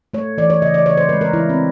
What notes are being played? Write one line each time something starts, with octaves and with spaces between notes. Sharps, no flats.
A3 C#5
E3 D5
C#5
C#3 D#5
D5
C#3 C#5
C5
G#3 B4
A#4
E3 E4
C4